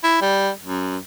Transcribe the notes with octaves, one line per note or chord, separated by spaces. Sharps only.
E4
G3
F#2